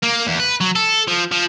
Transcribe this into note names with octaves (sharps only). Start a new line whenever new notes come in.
A#3
E2
B4
F#3
A4
F3
F3